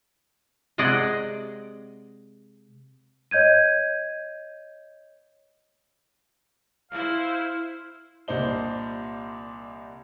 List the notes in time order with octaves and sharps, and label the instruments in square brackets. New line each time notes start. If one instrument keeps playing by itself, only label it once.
[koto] C3 G#3 G#4 D5 D#5 F#5
[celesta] C#5 D#5 G6 G#6 D#7
[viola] E4 C5 [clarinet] F5
[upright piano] C2 A#2 D4 C5 D#5 G7